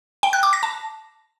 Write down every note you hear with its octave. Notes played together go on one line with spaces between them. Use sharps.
G5
F#6
D6
A#6
A5